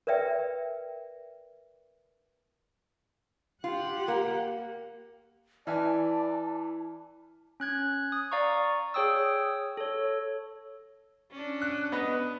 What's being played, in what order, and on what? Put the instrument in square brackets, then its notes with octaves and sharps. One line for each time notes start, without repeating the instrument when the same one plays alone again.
[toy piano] A#4 B4 D5 E5 G5
[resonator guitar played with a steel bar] F4 [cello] G4 F#5
[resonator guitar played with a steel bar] A#3
[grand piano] E3 E5 G#5 [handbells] E4 F6 [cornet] D5 [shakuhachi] A5
[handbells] C#4 F#6 G#6
D#6
D5 F5 A#5 C#6
G#4 C#5 G5 D#6 E6
A4 C#5
[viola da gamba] C#4 D4
[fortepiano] F#6
B3 B4 D#5